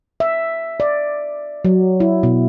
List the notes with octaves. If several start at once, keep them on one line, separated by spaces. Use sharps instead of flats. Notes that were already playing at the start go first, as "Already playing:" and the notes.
E5
D5
F#3
E4
B2